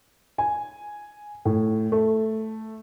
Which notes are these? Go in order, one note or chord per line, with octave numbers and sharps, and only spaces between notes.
G#5
A2
A3